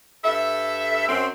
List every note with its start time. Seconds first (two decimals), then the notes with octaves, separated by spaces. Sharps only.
0.24 G2 A4 E5
1.08 F#2 C4